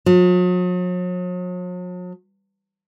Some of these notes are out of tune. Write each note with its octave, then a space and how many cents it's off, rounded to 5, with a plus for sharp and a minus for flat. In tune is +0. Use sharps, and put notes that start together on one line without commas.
F#3 -45